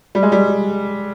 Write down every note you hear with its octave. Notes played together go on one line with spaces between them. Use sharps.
G3
G#3
G3